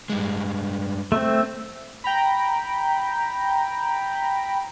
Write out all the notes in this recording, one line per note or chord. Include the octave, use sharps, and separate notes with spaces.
G2 G#3
A3 C4
G5 A#5 B5